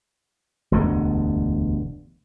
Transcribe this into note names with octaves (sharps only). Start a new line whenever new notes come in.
E1 D2 G2 D3